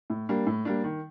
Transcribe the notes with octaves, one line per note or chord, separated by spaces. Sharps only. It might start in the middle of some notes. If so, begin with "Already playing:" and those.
A2
G3 A#3 D4
A2
G3 A#3 D4
D#3